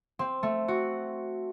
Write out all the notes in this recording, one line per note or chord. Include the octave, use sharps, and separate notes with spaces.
C4
A3
F#4